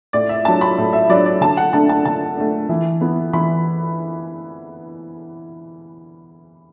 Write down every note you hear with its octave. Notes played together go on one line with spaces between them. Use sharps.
A2 D5
E5
F#3 D4 A5
B5
A2
E5
F#3 D4 D5
D5
D3 A5
F#5
A3 D4 A5
A5
D3 A5
A3 D4
E3
B3 E4
E3 B5